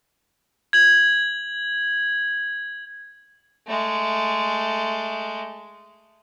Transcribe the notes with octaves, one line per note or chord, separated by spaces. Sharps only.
G#6 F#7
G#3 A3